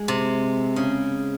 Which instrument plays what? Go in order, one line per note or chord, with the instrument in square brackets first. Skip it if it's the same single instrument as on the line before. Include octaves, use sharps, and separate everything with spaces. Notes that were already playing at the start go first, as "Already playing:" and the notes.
Already playing: [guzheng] G#3
C3
C#3